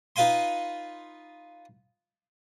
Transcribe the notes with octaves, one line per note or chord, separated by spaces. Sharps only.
D#4 F4 B4 F5 G#5 C6